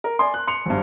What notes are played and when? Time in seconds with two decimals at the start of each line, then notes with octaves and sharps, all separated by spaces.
0.04 A#4
0.19 D5 G#5 C6
0.34 F#6
0.47 C6 C#7 F7
0.66 G#1 G2